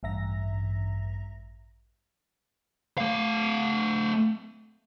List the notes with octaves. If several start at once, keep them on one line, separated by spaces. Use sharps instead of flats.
A1 G2 E5 A#5 A#6
A3 F5